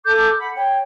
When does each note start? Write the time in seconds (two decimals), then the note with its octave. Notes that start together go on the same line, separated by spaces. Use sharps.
0.05 A4 D6 G6
0.38 F#5 B5
0.54 C#5 G5